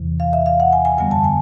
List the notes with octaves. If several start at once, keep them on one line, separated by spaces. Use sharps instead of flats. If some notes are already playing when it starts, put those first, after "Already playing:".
Already playing: E2 C3 E3
F5
E5
F5
F#5
G#5
G#5
F#2 D3 G3 B3 G#5
A5
G#5